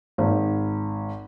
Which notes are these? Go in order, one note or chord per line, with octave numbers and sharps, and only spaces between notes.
G#1